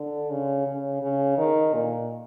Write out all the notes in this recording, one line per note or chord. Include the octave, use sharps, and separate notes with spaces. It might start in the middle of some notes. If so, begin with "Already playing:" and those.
Already playing: D3
C#3
C#3
C#3
D#3
A#2